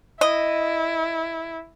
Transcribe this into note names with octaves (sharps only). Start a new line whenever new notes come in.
E4 D#5